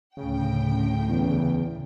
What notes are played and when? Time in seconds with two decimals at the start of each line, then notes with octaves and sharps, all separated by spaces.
0.17 D2 A2 C#3 G5
1.09 E2